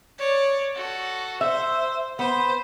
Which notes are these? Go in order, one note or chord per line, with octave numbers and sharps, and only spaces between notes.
C#5 D5
F#4 A4
C5 E5
B3 C5